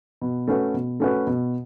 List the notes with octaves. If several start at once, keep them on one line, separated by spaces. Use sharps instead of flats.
B2
A3 C#4 F#4 B4
B2
A3 C#4 F#4 B4
B2